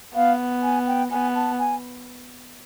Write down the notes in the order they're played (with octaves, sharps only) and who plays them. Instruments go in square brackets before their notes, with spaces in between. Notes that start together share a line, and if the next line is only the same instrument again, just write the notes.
[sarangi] B3 [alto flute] F5
[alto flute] G#5
G5
[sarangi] B3 [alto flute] G#5
[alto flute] A5
G#5